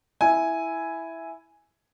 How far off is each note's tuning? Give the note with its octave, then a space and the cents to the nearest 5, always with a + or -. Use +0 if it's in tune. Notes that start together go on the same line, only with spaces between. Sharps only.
E4 +0 G#5 +0